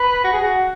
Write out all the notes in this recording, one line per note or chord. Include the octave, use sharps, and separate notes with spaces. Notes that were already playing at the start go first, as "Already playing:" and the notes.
Already playing: B4
F#4
G#4
F#4